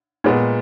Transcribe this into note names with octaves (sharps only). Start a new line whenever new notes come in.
A#2 G#3 B3